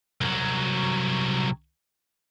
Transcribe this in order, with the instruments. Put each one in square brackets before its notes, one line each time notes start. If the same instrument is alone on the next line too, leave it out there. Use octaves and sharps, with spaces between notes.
[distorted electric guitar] C2 F#3